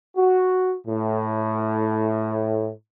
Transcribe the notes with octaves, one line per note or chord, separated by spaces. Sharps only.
F#4
A2